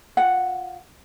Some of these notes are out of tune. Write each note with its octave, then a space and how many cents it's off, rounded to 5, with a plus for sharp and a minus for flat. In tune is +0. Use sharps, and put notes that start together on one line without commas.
F4 +20 F#5 +0